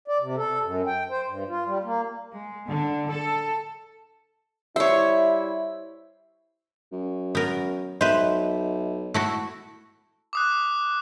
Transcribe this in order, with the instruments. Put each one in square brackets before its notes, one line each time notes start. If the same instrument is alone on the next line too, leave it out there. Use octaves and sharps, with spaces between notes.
[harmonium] D5
C3
A4
F#2
G5
C5
G2
F4
G3
A#3
[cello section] G#3
D3
A4
[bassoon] G3 [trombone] E4 [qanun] C5 C#5 [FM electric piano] E5
[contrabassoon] F#2
[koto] B3 A#4
[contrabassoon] B1 [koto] B4 C5 [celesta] D#5 E5
[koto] A3 E4 F#4
[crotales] D6 D#6 F#6